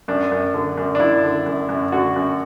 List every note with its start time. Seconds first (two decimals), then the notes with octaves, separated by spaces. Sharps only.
0.08 F#2 D4
0.32 F#2
0.54 D3
0.77 F#2
0.95 D4
1.00 F#2 E4
1.24 D3
1.46 F#2
1.69 F#2
1.92 D3 F#4
2.16 F#2